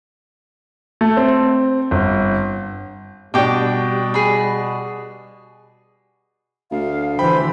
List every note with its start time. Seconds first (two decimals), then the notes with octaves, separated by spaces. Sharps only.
1.01 A3
1.17 C4
1.91 G1
3.34 B2 G3 D4 G4 D6
4.14 G#4 B5
6.71 D2 F5
7.19 D3 E3 C5 G5 B5